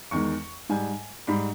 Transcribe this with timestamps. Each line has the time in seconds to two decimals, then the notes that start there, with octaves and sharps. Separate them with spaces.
0.11 E2 D#3 G#3 C#6
0.69 G#2 G3 G#5
1.27 G#2 G3 B5